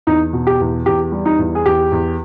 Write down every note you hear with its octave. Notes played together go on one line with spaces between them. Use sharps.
E2 D#4
B2
G4
E2
E2 G4
G3
D#4
E2
G#4
E2 G4
E2